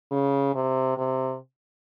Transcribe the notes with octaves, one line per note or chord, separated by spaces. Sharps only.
C#3
C3
C3